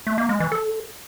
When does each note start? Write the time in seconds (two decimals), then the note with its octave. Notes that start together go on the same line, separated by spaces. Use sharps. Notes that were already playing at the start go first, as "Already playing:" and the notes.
0.07 A3
0.18 A#3
0.29 G#3
0.40 E3
0.52 A4